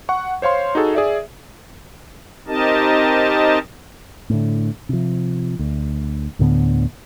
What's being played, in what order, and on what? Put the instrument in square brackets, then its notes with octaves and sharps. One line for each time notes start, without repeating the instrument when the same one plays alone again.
[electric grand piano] F#5 C#6
C5 C#5 F5 C6
D#4 F#4 G#4 A4
G#4 D5 E5
[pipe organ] C4 D#4 G4 A#4 D#5 A5
[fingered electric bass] A2 D3
C3 F3
D2
D2 A2 D3 B3